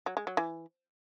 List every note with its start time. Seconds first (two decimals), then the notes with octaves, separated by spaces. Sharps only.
0.06 F#3
0.17 G#3
0.27 F#3
0.37 E3